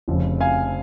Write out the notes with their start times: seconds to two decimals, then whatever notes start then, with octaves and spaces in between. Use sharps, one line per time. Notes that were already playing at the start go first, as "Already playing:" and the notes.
0.08 F1 F2 C#3 F3
0.40 F5 G#5